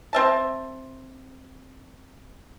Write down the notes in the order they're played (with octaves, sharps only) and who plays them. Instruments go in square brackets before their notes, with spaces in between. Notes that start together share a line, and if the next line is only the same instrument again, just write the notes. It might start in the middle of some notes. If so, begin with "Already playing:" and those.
[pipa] C4 E5 A5